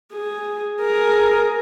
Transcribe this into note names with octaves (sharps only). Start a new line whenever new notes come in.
G#4
G#4 A#4